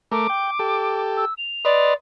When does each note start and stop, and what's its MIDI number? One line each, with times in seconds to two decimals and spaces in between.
0.12 0.27 57
0.12 0.27 70
0.12 1.00 86
0.30 0.51 79
0.59 1.25 67
0.59 1.25 69
1.17 1.34 88
1.38 1.93 101
1.65 1.94 71
1.65 1.93 74
1.65 1.94 75
1.65 1.94 84